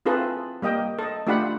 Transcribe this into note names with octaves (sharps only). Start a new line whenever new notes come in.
C4 E4 F4 G#4 A4 B4
G3 A#3 D#5 G5
A4 D#5
A3 D4 F4 G4 F#5 B5